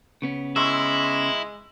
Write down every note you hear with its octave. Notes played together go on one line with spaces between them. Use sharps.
C#3 B3 C#4
G#3 E4 C6 C#6 E6